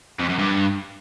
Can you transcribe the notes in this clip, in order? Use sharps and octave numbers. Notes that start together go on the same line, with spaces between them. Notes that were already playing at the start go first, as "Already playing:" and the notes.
F2
F#2
G2